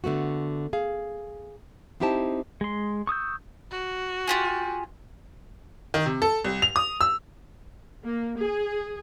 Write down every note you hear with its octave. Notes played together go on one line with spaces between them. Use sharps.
D3 A3 B3 F#4
G#4 F5
C4 D#4 E4 G4 C5 A5
G#3 C6
C#6 D#6 E6 G6
F#4
F4 G4 G#4
D#3
C3
A4
C2
F7
D#6
E6
A#3
G#4